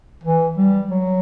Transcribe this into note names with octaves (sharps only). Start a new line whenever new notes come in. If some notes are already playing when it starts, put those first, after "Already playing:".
E3
G3
F#3